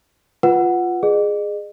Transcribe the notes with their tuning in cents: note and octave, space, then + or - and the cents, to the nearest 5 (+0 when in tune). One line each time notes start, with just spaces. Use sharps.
F4 +0 B4 +0 F#5 +0
G#4 +0 D#5 -40